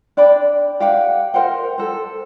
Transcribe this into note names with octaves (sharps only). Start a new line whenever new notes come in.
D4 D5 G5 B5
G4 F5 F#5
A#4 C5 F#5 G5
A4 C5